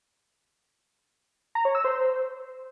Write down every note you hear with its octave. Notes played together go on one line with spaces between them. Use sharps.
A#5
C#5
E6
C5